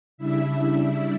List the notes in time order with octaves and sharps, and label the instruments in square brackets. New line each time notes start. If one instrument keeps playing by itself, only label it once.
[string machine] C#3 G3 D4 E4 E5